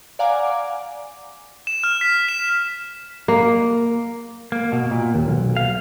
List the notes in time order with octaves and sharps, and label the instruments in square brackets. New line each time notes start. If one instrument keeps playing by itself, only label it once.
[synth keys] D5 F5 F#5 G#5 A#5 D6
[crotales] E7
F6
B6
E7
[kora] A#3
[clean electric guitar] A#3
B2
A#2
D#2
B1
F5